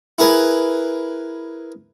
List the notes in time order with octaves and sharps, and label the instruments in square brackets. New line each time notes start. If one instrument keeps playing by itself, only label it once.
[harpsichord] E4 G#4 A#4 B4